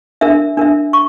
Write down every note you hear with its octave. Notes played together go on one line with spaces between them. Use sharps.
D4 A#4 E5
D4 A#4 E5
C#6